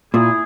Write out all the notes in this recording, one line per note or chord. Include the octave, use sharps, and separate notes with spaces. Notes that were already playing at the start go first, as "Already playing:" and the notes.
A#2 E4 G#4